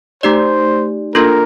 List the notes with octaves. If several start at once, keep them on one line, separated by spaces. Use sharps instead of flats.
A3 D#4 G4 C5 D5
A#3 D4 F4 A4 A#4